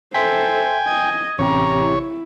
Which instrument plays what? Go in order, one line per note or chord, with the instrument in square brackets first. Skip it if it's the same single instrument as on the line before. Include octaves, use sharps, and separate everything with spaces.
[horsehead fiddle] A4 C5 [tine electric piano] E5 C6 B6 [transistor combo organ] G5 G#5
[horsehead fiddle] D#5 [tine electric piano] G#6
[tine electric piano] A1 C3 G4 [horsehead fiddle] C#4 A#5 [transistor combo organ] C#5
[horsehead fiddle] E4